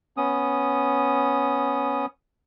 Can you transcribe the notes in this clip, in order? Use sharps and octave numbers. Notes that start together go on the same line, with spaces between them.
B3 C#4 D#6